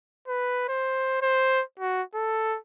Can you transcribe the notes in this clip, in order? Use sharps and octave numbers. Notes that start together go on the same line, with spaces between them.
B4
C5
C5
F#4
A4